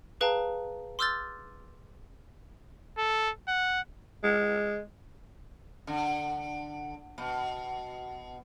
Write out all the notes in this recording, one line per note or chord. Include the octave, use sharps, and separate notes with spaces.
G#4 B4 F5 G5 A5 A#5
C6 D6 E6 F6 G6 A6
A4
F#5
G#3
D3
B2